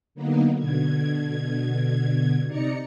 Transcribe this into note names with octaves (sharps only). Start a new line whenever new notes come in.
D3 F#3 A#3 B3 D#4
B2 D3 G#6
C3 D#4 D5 A#5 C#7